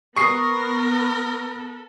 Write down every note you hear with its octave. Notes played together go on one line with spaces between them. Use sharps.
B3 A#4 C#6 D#6 C7